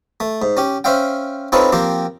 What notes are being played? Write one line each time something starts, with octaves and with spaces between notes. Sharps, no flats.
A3
G#2
C#4 G4
C#4 C5 E5 F5 G5
C4 D#4 F4 A4 B4 C#5
F3 A#3 C4 G4